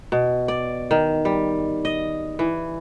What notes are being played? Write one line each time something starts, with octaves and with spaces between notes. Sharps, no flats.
B2
D5
D#3
G3
D#5
E3